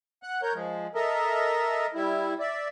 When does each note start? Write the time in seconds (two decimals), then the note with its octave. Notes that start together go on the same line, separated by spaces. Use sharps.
0.23 F#5 F#6
0.42 A#4 C#5 G6
0.54 F3 G#3
0.95 A4 A#4 D#5 E5
1.94 G3 E4
2.40 D5 E5